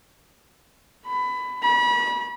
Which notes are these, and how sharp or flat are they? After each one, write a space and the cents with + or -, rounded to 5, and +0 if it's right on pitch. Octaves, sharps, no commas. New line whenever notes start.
B5 +20
B5 -35